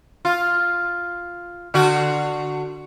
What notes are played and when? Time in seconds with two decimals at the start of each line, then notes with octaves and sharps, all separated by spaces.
0.25 F4
1.74 D3 F#4